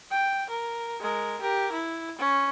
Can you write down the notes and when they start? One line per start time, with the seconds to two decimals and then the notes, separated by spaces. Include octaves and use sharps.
0.11 G5
0.50 A#4
1.00 G#3 A#4
1.41 G4 A#4
1.72 E4
2.18 C#4